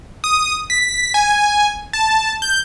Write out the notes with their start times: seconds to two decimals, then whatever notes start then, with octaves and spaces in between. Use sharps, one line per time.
0.24 D#6
0.70 B6
1.14 G#5
1.93 A5
2.42 G6